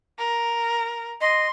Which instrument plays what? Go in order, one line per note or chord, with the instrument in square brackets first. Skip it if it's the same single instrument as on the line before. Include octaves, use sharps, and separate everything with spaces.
[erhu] A#4
[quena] D#5 [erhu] C6